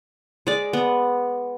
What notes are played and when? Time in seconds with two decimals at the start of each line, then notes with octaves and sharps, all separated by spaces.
0.47 G#3 D5
0.73 B3